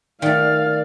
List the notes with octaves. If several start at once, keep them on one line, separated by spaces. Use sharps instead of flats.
D#3 A3 D5 F5